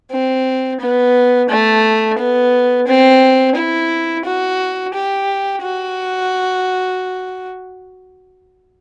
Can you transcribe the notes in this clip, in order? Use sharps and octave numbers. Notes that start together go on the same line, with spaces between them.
C4
B3
A3
B3
C4
E4
F#4
G4
F#4